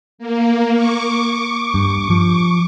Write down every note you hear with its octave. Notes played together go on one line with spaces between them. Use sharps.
A#3
C#6 D6
G2
F3